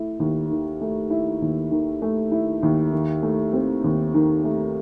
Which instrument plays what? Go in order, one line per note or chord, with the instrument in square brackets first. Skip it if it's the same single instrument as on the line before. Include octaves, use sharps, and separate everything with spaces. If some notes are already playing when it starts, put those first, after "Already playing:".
Already playing: [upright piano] A3 E4
D#2
D#3
A3
E4
D#2
D#3
A3
E4
D#2
D#3
A3
C4
D#2
D#3
A3